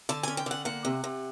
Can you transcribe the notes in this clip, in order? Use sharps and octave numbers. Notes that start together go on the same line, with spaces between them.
D3 A5
C#4 G#5
G5
D3 F#5
A#3 F#5
C3
C3